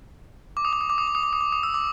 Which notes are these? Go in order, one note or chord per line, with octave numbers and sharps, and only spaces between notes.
D6
D#6
D6
D#6
D6
D#6
D6
D#6
D6
D#6
D6
D#6
E6
D6